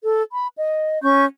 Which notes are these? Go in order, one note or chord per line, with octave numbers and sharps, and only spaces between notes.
A4
B5
D#5
C#4 C#6 G6